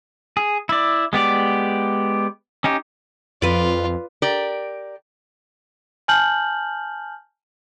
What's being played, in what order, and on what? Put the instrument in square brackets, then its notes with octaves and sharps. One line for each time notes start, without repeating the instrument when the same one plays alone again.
[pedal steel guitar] G#4
E4 D5
G#3 B3 G4 D5
C#4 D#4 G4
[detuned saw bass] F2 [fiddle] F4 [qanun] B4 D5
[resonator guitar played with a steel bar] G4 A#4 D5
[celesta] G#5 A5 F6 G6 F#7